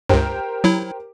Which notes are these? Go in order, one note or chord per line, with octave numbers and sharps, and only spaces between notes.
C#2 G2 G4 A#4 C5
F#3 E4